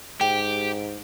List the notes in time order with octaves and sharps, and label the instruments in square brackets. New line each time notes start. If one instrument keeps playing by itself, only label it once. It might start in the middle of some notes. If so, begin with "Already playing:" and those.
[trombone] G#2 [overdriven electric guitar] G4 [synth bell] G5